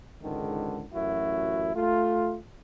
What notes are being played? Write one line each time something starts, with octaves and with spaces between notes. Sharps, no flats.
C#2 G#2 D3 D#3
A1 F#2 E4 F#4
A3 F4